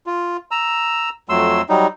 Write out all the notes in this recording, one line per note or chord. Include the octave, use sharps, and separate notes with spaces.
F4
A#5 E6
F2 F#3 A3 C6 E6
F#3 G3 D#4